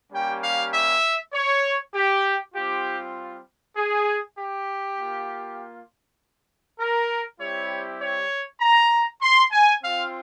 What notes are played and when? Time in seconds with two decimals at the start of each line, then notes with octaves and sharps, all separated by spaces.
0.12 G3 A#3 C#4 G4 G5
0.42 F5
0.73 E5
1.33 C#5
1.94 G4
2.54 G3 C4 F4 G4
3.76 G#4
4.36 G4
4.97 A#3 F4
6.79 A#4
7.40 G3 C4 E4 G4 C#5
8.00 C#5
8.61 A#5
9.22 C6
9.51 G#5
9.82 C4 F4 F5